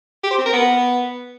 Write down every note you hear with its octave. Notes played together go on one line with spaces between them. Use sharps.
G4
C5
C4
A#4
B3